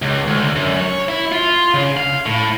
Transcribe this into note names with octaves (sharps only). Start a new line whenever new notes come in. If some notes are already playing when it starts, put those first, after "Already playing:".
C#2
D2
F#2
C#5
E4
F4
C#3
F5
A2